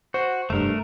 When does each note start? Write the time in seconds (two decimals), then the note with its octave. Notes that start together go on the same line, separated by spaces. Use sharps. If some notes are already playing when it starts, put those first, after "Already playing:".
0.14 F#4 C5
0.50 F1 G2 A3 A#4